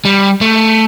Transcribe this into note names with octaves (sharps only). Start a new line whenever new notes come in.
G3
A3